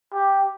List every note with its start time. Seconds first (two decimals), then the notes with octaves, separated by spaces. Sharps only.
0.14 G4